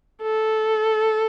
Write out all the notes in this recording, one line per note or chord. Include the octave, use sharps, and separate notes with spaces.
A4